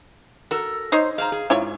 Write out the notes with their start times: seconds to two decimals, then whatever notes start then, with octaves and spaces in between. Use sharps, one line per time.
0.51 F#4 A4 A#4
0.92 D#4 C5 C#5
1.18 G#4 C5 F5 A#5
1.32 G#4
1.50 G#2 E4 F4 C#5